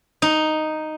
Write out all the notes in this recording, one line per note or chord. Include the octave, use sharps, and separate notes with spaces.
D#4